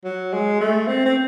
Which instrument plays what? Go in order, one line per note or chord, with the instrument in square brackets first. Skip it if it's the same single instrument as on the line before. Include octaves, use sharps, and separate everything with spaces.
[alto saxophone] F#3
G#3
A3
C4
C4